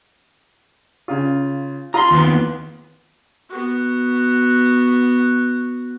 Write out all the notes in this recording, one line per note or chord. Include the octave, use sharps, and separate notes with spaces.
C#3 F4
F4 A#5 C6
D#2 B3
B3 F#4